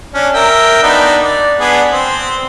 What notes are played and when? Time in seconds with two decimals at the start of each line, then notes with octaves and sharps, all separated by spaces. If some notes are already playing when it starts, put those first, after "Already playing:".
0.14 C#4 D4
0.34 A#4 E5 G5
0.83 B3 D4 D#4
1.23 D5
1.60 B3 D4 G#4
1.92 C4